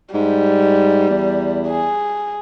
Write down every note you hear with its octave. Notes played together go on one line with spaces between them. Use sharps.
G#2 G3
E2
G#4